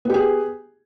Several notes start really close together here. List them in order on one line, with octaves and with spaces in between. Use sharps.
B3 G4 G#4